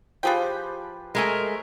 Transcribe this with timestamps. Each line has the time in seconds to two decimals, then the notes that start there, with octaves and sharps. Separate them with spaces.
0.23 F3 F4 G4 G#4 B4 G5
1.15 G#3 A3 A#4 G#5